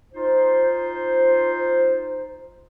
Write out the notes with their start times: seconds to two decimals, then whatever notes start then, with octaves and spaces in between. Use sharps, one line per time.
0.13 D#4 F4 C5